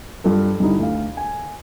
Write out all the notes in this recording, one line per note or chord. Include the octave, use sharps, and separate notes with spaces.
G2 F4 A4
G2 D3 G3 D#4 E4
D2 F5
G#5